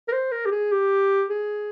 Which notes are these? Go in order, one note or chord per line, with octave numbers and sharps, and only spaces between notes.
A#4
C5
A#4
G4
G#4
G4
G#4